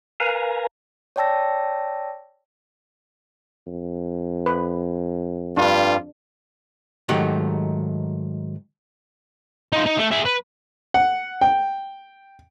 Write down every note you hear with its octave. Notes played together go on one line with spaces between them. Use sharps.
A#4 B4 F5 G#5 A#5
C#5 D5 G5 A5 E6 A#6
F2
B4
G2 G3 D4 F4
G#2 D#3 F#3 A3 D#4 G4
D#4 F4
D#4
A3
G#4 E5
B4
F#5
G5